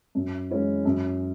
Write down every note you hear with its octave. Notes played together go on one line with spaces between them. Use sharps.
F#2
E3 G#3 C#4 E4
F#2